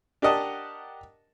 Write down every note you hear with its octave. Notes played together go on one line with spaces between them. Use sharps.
D4 G4 A#4 D#5 F#5 A5